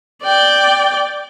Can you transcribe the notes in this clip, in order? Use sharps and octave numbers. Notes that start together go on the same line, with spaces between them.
D5 G5